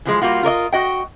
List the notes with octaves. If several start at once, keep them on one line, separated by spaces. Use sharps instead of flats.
E3 F3 G#3
G3 A#3 F4 F#4
F4 A#4 D5 D#5
F#4 D#5 G5